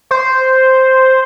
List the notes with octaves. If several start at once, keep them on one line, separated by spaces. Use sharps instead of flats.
C5